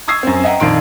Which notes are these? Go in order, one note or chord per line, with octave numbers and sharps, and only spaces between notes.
C#6 D#6 E6 G#6 C7
F#2 C4
D#5 E5 F#5 G5 A#5
A#1 F2 D#3 C6 D7